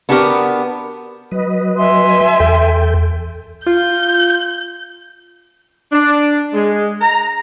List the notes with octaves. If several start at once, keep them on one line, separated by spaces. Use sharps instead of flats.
B3 D4 F#4 G4 A#4
F#3 B4 D#5
E5 G#5 C6
E2 A4 G5
F4 G6
D4
G#3
A#5